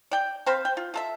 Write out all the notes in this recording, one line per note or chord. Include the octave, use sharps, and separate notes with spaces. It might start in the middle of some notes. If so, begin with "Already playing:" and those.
D5 G5
C4 C5 F5 B5
G5
F4
F4 A4 E5